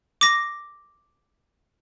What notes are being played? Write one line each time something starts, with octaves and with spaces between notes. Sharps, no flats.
D6 A#6